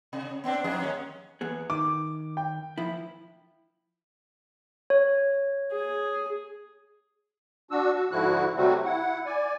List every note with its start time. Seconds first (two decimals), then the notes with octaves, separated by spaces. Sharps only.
0.13 C3
0.44 B3 C4 D4
0.64 F2 G#2 G#4
0.80 D#2 G#2 C#4
1.41 E2 B3 G#4
1.70 D#3 D6
2.37 G5
2.78 F3 E4
4.90 C#5
5.72 G#4
7.71 D4 F#4 E6
7.94 F#4
8.11 G#2 D3 F3 E4 F#4 F#6
8.56 C3 F#3 G3 A3 C4 F#4
8.85 E4 F#5
9.26 D5 G#5